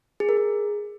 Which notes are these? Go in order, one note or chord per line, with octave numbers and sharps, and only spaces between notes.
G#4
A#4
G#4